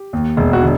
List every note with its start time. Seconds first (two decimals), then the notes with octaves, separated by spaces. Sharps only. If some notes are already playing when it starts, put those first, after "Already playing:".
Already playing: G4
0.13 D#2
0.37 E1
0.53 F#4
0.62 D3